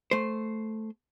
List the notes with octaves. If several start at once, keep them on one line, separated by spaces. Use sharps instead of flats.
A3 C5